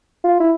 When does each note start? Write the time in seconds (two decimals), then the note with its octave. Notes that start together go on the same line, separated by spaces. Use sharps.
0.24 F4
0.40 E4